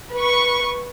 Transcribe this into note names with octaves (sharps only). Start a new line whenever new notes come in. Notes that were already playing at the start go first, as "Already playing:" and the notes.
B4 C#6